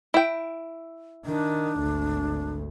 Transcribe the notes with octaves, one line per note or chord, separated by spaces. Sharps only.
E4 G5
D#3 D4
G#1 D2